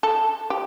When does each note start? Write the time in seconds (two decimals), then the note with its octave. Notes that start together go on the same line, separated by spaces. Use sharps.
0.03 A4
0.50 G4